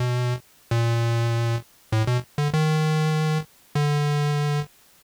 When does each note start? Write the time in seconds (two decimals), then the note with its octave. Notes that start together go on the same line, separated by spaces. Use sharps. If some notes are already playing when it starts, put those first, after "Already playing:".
Already playing: B2
0.71 A#2
1.92 A2
2.07 B2
2.38 D3
2.54 D#3
3.75 D3